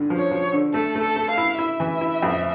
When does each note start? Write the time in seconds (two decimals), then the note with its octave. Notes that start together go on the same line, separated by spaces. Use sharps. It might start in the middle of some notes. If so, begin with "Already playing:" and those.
Already playing: G2 D3
0.10 F3
0.17 C#5
0.31 F3
0.53 D3
0.74 A3 A4
0.95 A3
1.02 A4
1.16 A3
1.31 F5
1.38 E4
1.58 E4 E5
1.80 E3
2.01 E4
2.23 F2